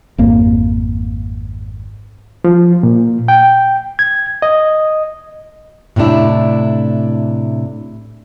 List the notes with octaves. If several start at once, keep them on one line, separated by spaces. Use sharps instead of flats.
G#1 F2 A#3
F3
A#2
G5
G#6
D#5
A2 C3 A3 D4 E4